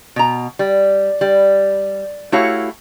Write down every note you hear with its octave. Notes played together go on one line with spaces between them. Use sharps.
B2 A#5
G3
G3
A3 E4 F#4 G4 C#5 F5